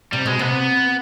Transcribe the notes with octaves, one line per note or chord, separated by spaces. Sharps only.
C3 G3
B2 G#3
C3 B3